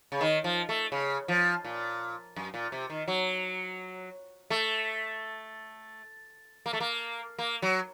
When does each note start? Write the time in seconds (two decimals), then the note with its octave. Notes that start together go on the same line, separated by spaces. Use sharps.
0.12 C#3
0.21 D#3
0.44 F3
0.69 A3
0.92 C#3
1.28 F3
1.65 A#2
2.36 F#2
2.54 A#2
2.72 C3
2.90 D#3
3.08 F#3
4.50 A3
6.66 A#3
6.73 A3
6.80 A#3
7.39 A#3
7.62 F#3